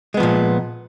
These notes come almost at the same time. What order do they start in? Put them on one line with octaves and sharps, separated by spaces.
G#3 B3 F3 A#2